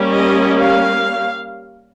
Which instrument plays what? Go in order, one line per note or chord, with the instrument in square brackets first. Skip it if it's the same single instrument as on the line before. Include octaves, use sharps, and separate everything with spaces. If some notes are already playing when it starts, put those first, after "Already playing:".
Already playing: [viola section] G3 A#3 C#4
D#5
F5